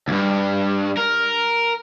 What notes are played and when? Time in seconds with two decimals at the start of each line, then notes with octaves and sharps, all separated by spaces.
0.08 D2 G2
0.97 A#4